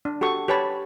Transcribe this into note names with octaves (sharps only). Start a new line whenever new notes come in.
D4
F#4 G4 A4 C#6
G4 B4 C#5 A5 B5